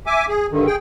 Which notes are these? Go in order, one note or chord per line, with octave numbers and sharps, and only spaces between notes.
E5 G#5 D6
G#4
G2 D3 D#3
G#4 G5